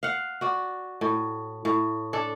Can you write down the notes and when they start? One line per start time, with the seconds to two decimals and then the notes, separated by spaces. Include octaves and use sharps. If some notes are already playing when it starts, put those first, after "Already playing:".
0.03 F5 F#5
0.41 F#4 D5
1.01 A2
1.65 A2
2.13 D4 A4